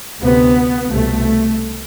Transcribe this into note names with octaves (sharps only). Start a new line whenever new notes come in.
D2 C3 B3
C2 B2 A3